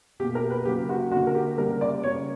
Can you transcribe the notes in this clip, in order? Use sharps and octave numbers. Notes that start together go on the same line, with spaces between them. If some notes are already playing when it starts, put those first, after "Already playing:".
B2 A#3 G4
A#4
B4
C#3 F#3 A#3 G4
F#4
D3 A#3 F#4
A#4
G4
C#3 G3 A#3 A#4
D5
C#3 G3 A#3 C#5